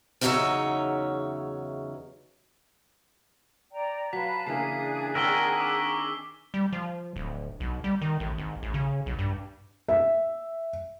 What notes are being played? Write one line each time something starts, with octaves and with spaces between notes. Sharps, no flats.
E2 C#3 F#3 D#4 C#5 E5
D5 G5 A#5
F#3 B4 F5 A5 B6
C#3 E3 A#3 D4 G#4 C7
D#3 C4 F#4 A#4 C#5 E6 B6 G7
C#6 D6 E6
G3
F3
D1
B1
G3
D#3
A1
G#1
A1
C#3
B1
G2
E5